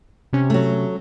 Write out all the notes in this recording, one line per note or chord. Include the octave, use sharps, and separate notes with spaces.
C3 C#4
F#3 A3